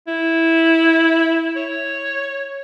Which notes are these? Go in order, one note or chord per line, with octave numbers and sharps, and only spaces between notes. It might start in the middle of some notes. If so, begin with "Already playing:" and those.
E4
C#5